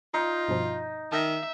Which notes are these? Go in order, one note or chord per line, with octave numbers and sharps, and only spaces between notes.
D#4 F4
G2 B2 F3
D#3 E5 A5 A#6